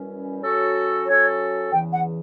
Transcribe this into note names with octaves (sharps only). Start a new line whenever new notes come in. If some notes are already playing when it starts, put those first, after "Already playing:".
Already playing: F#2 E3 G3 C#4
F#3 C#4 F#4 A4
F#3 C#4 F#4 A4 C#5
E2 C#3 E3 G5
F#5